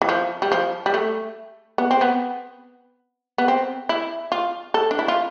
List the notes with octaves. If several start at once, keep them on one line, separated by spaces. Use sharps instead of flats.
E3
F3
G3
F3
G3
A3
B3
C4
B3
B3
C4
E4
F4
A4
D4
E4
F4